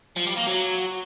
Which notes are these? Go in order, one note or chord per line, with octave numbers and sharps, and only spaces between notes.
F3
G3
A#3
F#3